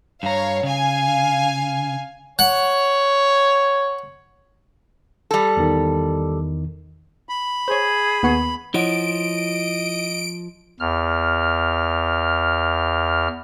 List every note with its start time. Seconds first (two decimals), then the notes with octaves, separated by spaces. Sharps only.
0.23 G2 C#5 F5 A#5
0.63 C#3 F5 G#5
2.39 C#5 F#5
5.31 G3 A4
5.57 E2 D#3
7.29 B5
7.68 G#4 C5 C#5
8.23 D#2 B3 C#6
8.74 F3 E4 C#5 D#5 F#5 D7
10.80 E2 F6